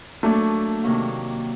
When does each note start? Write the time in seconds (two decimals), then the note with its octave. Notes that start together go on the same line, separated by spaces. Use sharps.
0.23 F#3 A3 A#3 D4 F#4
0.84 C3 D#3 F#3 A#3